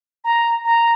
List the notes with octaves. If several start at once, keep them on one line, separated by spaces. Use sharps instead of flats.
A#5
A#5